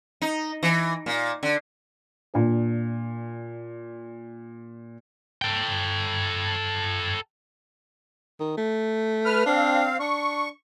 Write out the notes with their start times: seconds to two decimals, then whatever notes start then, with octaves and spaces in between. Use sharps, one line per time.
0.22 D#4
0.63 E3
1.06 A#2
1.43 D3
2.34 A#2 D4
5.42 A4 G5
8.40 D#3
8.57 A3
9.25 B4 F6
9.46 C4 D4 F5
10.00 D4 C#6